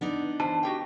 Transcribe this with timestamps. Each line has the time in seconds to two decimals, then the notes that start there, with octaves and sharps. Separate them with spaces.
0.01 B3 D4 D#4
0.40 E3 C5 A5
0.63 F#4 G4 G5